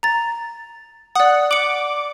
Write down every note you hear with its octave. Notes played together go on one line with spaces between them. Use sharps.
A#5 A6
D5 F#5 D#6
D6 C#7 F#7